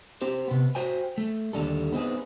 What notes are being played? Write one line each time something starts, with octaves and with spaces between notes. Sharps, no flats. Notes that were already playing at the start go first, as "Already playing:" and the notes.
C4 G4 C5
C3 B3
F#4 C5 G5 G#5
A3
D#2 D3 G3 A4
B3 C4 D#4 G#4